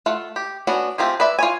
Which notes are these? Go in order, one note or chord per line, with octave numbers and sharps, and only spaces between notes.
A3 F4 F#5
G4
B3 C#4 D4 F#4 F#5
A3 C4 F4 G4 G#4
B4 D5 E5
F4 C#5 G#5